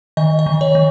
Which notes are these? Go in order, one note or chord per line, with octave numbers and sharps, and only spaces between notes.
D#3 D#5
D#5
D#3
C#5
D#3